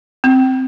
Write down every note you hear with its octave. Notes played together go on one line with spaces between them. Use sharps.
C4